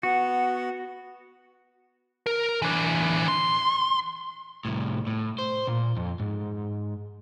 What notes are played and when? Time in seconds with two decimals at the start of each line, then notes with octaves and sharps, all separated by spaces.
0.03 B3 F#4 F#5
2.26 A#4
2.62 E3 D4
3.28 C6
4.65 C2 A2
5.07 A2
5.39 C5
5.67 A#2
5.97 F2
6.20 G#2